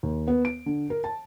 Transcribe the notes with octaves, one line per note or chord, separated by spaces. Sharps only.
D#2
B3
D7
D3
A#4
A5